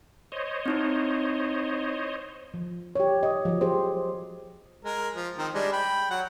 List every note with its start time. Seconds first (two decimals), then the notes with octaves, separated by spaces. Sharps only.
0.32 C5 C#5 D#5
0.66 C4 D#4 E4
2.54 F3
2.95 G4 C#5
3.23 D#5
3.45 F3 F#3
3.61 G4 G#4 C5
4.85 G#3 A#4
5.14 F3
5.38 D#3 C4
5.54 G3 G#3 D4
5.72 G5 B5
6.10 F#3 F#5